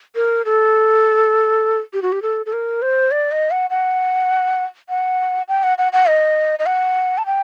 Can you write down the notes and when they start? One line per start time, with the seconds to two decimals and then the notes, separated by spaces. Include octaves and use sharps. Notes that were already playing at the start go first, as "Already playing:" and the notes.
0.15 A#4
0.45 A4
1.93 G4
2.02 F#4
2.12 G4
2.22 A4
2.46 A4
2.53 A#4
2.82 C5
3.11 D5
3.31 D#5
3.51 F#5
3.70 F#5
4.89 F#5
5.48 G5
5.63 F#5
5.78 F#5
5.93 F#5
6.08 D#5
6.59 D#5
6.67 F#5
7.18 A5
7.26 G5